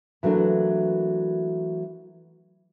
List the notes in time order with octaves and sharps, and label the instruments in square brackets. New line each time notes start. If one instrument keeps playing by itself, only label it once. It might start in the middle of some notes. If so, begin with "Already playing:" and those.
[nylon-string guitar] E3 F#3 A3 A#3 D4